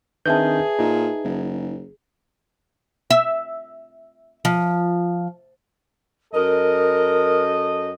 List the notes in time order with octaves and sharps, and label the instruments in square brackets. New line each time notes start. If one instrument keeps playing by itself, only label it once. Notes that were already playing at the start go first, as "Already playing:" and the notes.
[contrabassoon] D#3 [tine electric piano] C4 D4 G6 [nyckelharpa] G#4 [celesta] B4 E5 A5
[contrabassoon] A#2 [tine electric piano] D#4
[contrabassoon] F#1
[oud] E5
F3
[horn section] F#2 A4 D#5 [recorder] A#4